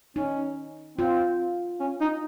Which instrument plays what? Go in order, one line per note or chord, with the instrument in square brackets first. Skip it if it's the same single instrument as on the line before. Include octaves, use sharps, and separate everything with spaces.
[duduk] C#4 [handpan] D#4
[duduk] C4 [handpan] F4
[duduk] C#4
D#4